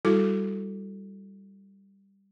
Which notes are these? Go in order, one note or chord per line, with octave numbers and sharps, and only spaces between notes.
G3 E4 F#4 A4 D6